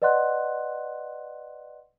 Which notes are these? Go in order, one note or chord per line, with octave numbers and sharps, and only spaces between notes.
B4 D5 D#5 F#5 C6 F#6